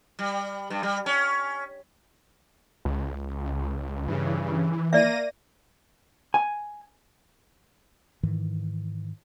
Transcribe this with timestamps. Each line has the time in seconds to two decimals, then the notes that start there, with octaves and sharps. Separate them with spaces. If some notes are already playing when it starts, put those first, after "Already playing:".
0.19 G3
0.70 G2
0.83 G3
1.06 C#4
2.85 C#2
4.08 G2 C#3 E3
4.93 A#3 D5 E5 A#6 D#7
6.34 G#5
8.23 G#2 D#3 E3